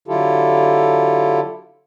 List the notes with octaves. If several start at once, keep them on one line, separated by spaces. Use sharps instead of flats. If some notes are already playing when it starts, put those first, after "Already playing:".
D3 F#3 E4 F4 G4 A4